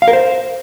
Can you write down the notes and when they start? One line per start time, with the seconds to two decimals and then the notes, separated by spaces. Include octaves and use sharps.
0.02 F5
0.08 A#4
0.13 C5